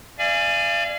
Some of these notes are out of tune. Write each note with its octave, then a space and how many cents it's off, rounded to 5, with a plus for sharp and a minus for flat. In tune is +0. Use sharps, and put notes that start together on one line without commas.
D5 +25 F5 -35 G#5 +0